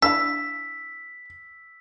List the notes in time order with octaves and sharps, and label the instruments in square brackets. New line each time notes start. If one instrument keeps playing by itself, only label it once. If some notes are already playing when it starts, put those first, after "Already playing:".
[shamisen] D4 E4 F5 [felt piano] E6 [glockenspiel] B6